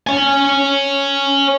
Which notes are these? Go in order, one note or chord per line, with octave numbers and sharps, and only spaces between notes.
C#5 G#5